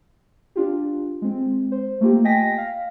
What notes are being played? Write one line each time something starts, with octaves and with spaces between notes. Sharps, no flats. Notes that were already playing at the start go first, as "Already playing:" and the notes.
D4 F4 G4
G#3 C4
C5
A3 A#3 F4 G4
D#5 G5 G#5 A#6 B6
F5